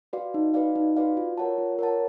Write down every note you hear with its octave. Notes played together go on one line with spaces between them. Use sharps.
F#4 B4 D5 F5
D#4
F#4 B4 D5 F5
D#4
F#4 B4 D5 F5
F4
A#4 C#5 F#5 A5
F4
A#4 C#5 F#5 A5